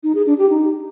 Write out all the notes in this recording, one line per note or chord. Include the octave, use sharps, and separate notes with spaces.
D#4
G#4
D4
G4
D#4